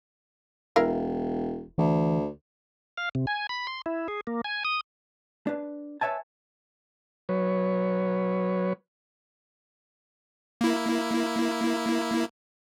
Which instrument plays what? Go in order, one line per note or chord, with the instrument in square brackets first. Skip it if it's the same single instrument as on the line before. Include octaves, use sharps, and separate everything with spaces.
[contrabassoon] E1 [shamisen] E4 A#4 F5
[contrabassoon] D2 [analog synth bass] E3
[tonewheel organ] F5
C3
G#5
B5
C6
E4
G#4
A#3
G#5
D#6
[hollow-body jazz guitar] D4 B4
B4 C#5 E5 G#5 A5
[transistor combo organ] F#3 B4 C#5
[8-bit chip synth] A#3 E4